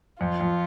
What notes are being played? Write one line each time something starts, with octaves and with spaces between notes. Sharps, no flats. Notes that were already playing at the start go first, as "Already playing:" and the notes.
F2 F4
F2